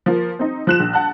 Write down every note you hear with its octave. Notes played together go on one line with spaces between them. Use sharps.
F3 A#3
C4 D#4
F3 F#6 E7
A#1
F#5 A5 F#6